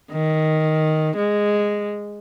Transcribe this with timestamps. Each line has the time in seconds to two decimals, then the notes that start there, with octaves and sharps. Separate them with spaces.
0.12 D#3
1.16 G#3